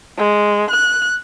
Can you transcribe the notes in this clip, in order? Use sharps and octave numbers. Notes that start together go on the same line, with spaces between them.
G#3
F#6